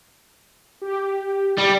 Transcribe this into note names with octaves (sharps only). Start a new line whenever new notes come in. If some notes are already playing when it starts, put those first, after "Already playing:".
G4
G3